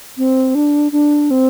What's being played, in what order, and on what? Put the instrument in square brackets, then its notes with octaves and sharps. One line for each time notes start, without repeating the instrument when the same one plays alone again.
[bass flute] C4
D4
D4
C4